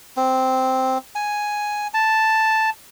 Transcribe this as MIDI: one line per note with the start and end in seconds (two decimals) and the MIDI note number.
0.17 0.98 60
1.15 1.87 80
1.94 2.70 81